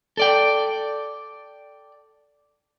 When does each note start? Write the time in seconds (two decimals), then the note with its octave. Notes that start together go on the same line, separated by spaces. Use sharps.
0.17 A4 D5 G5